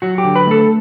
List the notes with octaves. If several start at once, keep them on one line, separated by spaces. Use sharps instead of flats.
F#3 F#4
G4
D3
B4
A3 A4